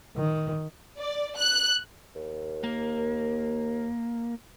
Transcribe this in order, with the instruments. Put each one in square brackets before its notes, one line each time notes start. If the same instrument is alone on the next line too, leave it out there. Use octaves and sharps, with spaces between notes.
[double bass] D#3
[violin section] D5
F#6
[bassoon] D#2
[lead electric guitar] A#3